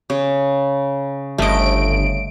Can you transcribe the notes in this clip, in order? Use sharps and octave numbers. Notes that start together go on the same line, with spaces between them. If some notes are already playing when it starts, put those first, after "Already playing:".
C#3
G1 A3 D#5 D7